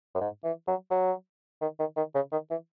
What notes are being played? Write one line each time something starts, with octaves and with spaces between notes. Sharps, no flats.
F#2
G#2
E3
F#3
F#3
D#3
D#3
D#3
C#3
D#3
E3